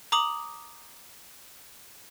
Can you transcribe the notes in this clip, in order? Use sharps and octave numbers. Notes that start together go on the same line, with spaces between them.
A#5 D6 D#6 F#7